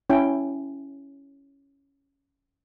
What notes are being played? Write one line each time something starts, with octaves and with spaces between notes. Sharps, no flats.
C#4 E4 G5